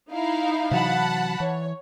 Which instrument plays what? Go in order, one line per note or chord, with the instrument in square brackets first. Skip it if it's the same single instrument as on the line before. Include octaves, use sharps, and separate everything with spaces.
[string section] D#4 E4 F5
[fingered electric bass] C3 E3 F#3 [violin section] F#5 A5 B5
[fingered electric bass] E3 [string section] C#5